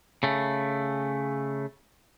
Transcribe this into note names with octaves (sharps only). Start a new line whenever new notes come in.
C#3 A3